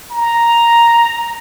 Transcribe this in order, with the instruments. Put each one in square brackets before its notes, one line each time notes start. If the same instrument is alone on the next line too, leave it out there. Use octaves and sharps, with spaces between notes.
[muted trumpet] A#5